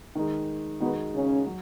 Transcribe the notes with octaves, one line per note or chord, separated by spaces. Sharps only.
D#3 G#3 D#4
B2 D#3 G#3 B3 D#4 F#4
C#3 C#4
F#3